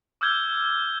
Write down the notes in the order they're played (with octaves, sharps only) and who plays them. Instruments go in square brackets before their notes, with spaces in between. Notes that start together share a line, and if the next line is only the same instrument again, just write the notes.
[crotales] D6 E6 F6 G6 G#6 G7